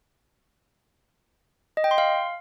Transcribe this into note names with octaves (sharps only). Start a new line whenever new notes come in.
D#5
G5
C6
F5